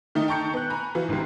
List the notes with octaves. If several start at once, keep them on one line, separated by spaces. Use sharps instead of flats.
D#3 A3 D#4
G5 A5 A#5 C#6 G6 C#7
B3 F#6
G#5 A#5 B5
E3 F4 F#4
G#1 G#2 C3 D#3